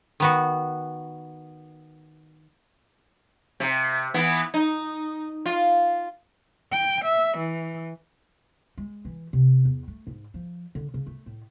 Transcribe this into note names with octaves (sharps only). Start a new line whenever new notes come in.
D#3 B3 F#4
C3
E3 B3
D#4
F4
G5
E5
E3
G#3
E3
C3
E2
A3
G#2
F3
D3
C#3
A3
A2